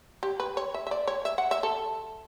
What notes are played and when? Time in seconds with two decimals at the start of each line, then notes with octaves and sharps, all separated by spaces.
0.23 G4
0.40 B4
0.57 C#5
0.74 E5
0.87 E5
0.91 D5
1.07 C#5
1.25 E5
1.38 F#5
1.51 E5
1.63 A4